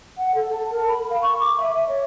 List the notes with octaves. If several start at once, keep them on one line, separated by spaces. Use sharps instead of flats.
F#5
A4
A5
A#4
B5
F5
C#6
D6
E5
E5
C#5